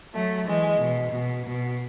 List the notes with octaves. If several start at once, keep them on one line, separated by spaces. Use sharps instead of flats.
F#3 A3
E3 G#3
B2
B2
B2